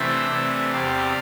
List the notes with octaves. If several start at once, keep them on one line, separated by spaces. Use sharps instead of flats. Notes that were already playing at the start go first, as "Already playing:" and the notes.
Already playing: C3 E3 A3 D4 C5 E5
C3 E3 A3 D4
E2 C3 G3 C4 D5 F5